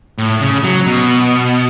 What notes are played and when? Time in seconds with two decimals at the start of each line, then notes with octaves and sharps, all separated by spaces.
0.18 A2
0.41 C#3
0.64 F#3
0.86 B2